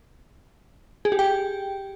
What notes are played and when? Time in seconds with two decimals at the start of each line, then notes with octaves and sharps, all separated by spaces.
1.05 G#4
1.12 G4
1.19 G5